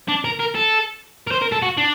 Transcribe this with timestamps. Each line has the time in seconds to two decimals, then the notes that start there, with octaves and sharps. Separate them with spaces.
0.09 D4
0.24 A#4
0.39 A#4
0.55 A4
1.27 A#4
1.32 C5
1.42 A#4
1.52 A4
1.62 F#4
1.77 D4